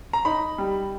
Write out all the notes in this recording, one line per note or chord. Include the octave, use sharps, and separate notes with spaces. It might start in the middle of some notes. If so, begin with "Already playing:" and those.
A#5
D#4 B5
G3